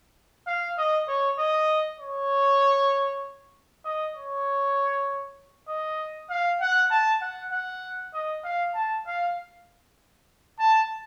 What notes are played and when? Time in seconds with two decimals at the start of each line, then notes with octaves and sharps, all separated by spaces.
0.47 F5
0.78 D#5
1.08 C#5
1.38 D#5
2.00 C#5
3.85 D#5
4.15 C#5
5.68 D#5
6.30 F5
6.61 F#5
6.90 A5
7.21 F#5
7.52 F#5
8.14 D#5
8.44 F5
8.74 A5
9.06 F5
10.59 A5